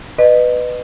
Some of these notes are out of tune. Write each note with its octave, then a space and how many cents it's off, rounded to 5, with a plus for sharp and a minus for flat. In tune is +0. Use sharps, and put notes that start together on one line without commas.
B4 +5 D#5 -30